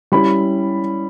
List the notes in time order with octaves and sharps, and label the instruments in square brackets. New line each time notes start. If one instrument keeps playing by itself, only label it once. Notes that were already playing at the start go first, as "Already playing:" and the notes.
[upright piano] G3 C#4 E4 B5